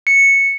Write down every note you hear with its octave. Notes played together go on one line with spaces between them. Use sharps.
C#7